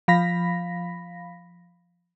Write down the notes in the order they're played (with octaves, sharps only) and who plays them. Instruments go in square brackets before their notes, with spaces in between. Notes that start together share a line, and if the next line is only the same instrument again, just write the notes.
[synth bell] F3 F5 B5 A#6 B6